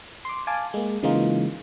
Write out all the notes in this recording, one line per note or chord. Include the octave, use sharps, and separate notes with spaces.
C6 D6
F5 G#5 A5 D6
G#3 A#3
C#3 E3 G#3 A#3 D#4 F4